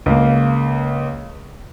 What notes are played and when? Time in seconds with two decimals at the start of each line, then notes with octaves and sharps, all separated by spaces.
0.06 C#2 A#3